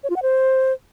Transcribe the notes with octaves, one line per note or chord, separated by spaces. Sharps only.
C#5
F4
F#5
C5